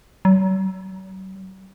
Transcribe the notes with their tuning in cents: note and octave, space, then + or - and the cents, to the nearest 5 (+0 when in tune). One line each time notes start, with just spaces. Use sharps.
F#3 +40